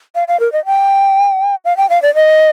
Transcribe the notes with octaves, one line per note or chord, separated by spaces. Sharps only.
F5
F5
A#4
D#5
G5
F5
G5
F5
D5
D#5